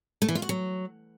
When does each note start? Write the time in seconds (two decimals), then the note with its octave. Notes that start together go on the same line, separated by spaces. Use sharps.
0.22 A3
0.29 E3
0.35 F4
0.42 F#4
0.49 F#3